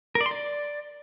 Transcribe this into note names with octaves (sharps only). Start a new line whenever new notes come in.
A#4
D5
C6
D5